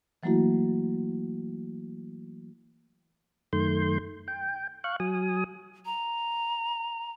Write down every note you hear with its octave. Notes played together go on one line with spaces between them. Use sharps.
E3 F#3 A3 A#3 E4 F#4
F#2 D#3 A3 C6 G6
G5
F5 C#6 F#6
F#3 G#5 D#6
A#5